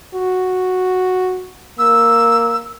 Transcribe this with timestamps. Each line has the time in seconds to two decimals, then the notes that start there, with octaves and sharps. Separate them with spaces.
0.14 F#4
1.79 A#3 E6